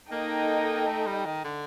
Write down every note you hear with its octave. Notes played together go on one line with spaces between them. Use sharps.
A#3 D#4 A4 D#5 G5
A3
G3
D#3
D3